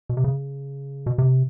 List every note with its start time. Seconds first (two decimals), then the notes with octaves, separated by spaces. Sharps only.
0.09 B2
0.17 C3
0.24 C#3
1.06 B2
1.18 C3